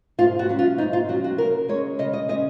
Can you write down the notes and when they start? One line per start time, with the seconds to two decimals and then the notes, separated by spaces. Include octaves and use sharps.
0.18 G#2 F4
0.39 F#4
0.49 F#3 C#4
0.59 F4
0.78 G#2 D#4
0.93 F4
1.09 F#3 C#4 F#4
1.24 F#4
1.38 C#3 A#4
1.68 G#3 C#4 C#5
1.99 C#3 D#5
2.13 D#5
2.29 G#3 C#4 D#5